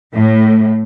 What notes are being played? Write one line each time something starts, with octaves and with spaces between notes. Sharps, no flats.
A2